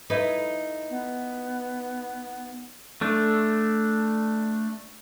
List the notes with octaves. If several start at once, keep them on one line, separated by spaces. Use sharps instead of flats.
D#4 E4 B4
B3
A3 D4